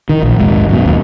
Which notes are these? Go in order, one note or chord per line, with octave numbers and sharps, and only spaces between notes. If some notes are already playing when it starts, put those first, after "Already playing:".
D#3
A#1
D#2 G#2
F#2 B2
D#2